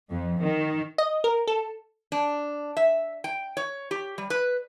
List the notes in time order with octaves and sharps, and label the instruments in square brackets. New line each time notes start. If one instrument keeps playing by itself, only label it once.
[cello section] F2
D#3
[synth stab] D#5
A#4
A4
[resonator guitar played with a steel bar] D4
E5
G5
C#5
G4
G3
B4